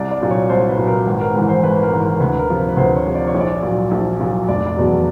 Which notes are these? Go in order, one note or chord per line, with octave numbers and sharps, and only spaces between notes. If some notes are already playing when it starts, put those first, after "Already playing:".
Already playing: C2 D5
D5
A#2 F#3
C#5
C2 C5
B4
A#2 F#3
A#4
G#1 B4
A#4
G#2 E3 B4
C5
G#1 B4
A#4
G#2 E3
A#4
D2 B4
A#4
C3 F3
B4
B4
D2 C5
C#5
C3 F3
D5
C#5
A#1
D5
A#2 F#3
A#1
A#2 F#3
F1 D5
D5
E2 B2 F#3